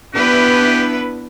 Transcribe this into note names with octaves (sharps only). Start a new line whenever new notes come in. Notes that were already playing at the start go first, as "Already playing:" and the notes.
B3 D4 E4 G4 B4